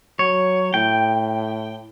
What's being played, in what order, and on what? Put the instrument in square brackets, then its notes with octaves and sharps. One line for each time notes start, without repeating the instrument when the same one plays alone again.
[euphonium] F#3 [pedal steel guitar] C#5
[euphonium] A2 [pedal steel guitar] G5